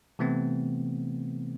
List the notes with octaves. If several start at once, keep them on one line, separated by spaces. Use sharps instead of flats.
C3 E3 A3 B3 C4